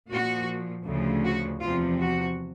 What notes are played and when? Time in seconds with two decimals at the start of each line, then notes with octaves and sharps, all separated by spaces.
0.10 A#2 F3 F#4
0.86 D2 C#3 F3
1.24 F#4
1.61 E2 C3 F3 F4
1.99 F#4